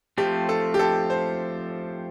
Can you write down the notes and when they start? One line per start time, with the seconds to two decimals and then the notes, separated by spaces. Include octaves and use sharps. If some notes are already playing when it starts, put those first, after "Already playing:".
0.18 F3 A3 C4 G4
0.49 A4
0.74 G4
0.79 A4
1.10 C5